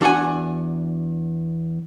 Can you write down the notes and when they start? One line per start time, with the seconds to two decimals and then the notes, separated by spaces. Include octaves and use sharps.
0.01 E2 D4 F#4 F#5 G#5